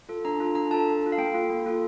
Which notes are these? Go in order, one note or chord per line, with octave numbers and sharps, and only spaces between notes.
F4 A4
D4 A#5
F4 A4
D4 A#5
F4 A4 A5
D4
F4 A4
F5
A#3 G5
F4 A4
A#3
F4 A4